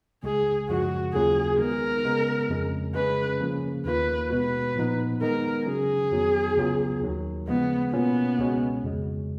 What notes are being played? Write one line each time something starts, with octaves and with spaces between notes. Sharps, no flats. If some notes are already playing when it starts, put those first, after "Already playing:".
C#2 C#3 G#3 G#4
F#2 C#3 F3 G#3 F#4
D#2 C#3 F#3 A#3 F4 G#4
D#3 G#3 B3 A#4
C#3 G#3 B3
F2 C#3 G#3
C#3 G#3 C#4 B4
C#3 F3 A#3 C#4
D#2 D#3 A#3 F4 B4
B2 G#3 B3 F#4 B4
A#2 F3 B3 D#4
D#3 G#3 B3 D#4 A#4
C#3 F#3 C#4 G#4
F2 D#3 F#3 B3 F#4
C#2 C#3 F#3 B3 F4
D#2 D#3 F#3
C#3 F3 G#3 B3
B2 A#3 B3 C#4 F4
C#2 B2 G#3 C#4 F#4
F2 C#3 G#3